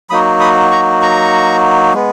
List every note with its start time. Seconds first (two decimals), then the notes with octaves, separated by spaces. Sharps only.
0.10 F#3 A#3 D#4 F#4 B5 D#6
0.40 B5 D#6
0.71 A#5 C#6
1.01 A#5 C#6
1.94 G#3 B3